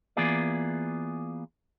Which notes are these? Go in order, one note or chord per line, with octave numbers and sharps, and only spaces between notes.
E3 A#3 B3 F4 G#4 D5